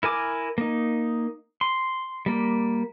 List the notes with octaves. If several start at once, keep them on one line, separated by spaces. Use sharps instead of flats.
E4 A#4 G#5 D6
A#3 D#4
C6
G3 A#3